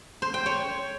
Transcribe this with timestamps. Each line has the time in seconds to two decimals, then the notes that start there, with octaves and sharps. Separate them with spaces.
0.22 C5
0.34 G5
0.46 C#5